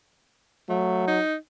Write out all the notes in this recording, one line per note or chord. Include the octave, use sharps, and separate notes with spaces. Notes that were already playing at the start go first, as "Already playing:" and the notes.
F#3 A3
D#4